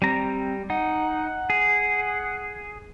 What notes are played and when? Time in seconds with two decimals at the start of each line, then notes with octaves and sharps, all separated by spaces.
0.02 G3 C4 A#5
0.70 D#4 F#5
1.50 G#4